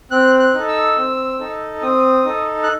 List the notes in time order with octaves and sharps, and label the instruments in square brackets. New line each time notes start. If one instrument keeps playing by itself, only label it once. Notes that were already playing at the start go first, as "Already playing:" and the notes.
[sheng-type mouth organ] C4 F#6
F#6
D#4 A4
E6
C4
D#4 A4
C4 D#6
D#4 A4
F#6